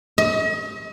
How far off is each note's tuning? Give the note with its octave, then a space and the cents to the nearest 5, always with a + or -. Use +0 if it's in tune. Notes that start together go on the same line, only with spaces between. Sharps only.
D#5 +40